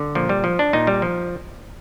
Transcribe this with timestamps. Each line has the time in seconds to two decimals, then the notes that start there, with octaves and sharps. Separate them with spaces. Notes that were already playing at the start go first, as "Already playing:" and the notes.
Already playing: D3
0.15 A#2 F3
0.29 G3
0.44 F3
0.59 D4
0.73 A#2 D#4
0.87 G3
1.02 F3